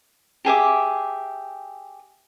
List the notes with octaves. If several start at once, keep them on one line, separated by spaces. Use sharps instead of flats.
G4 G#4 E5 D6